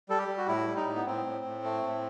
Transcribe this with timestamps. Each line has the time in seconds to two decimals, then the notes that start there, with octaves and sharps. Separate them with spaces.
0.09 G3 A4
0.18 G4
0.28 G3
0.37 F#4
0.48 A2 E4
0.67 G3
0.77 D#4
0.86 A2
0.95 B3
1.06 A2 C4
1.25 A2
1.45 A2
1.64 A3
1.83 A2